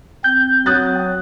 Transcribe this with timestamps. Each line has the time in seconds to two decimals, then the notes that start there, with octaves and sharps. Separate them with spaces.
0.24 C4 G6
0.66 F#3 D#6 F#6 A6